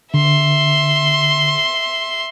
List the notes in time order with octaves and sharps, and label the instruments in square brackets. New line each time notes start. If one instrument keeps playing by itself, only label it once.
[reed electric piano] D3 [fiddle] E5 C6